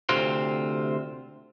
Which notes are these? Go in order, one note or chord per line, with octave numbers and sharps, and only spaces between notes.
D2 C3 C4 F4